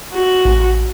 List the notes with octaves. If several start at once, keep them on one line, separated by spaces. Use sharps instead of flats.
F#4
A1